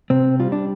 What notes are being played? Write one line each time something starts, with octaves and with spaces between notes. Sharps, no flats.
C3 C4
G3 F4
D4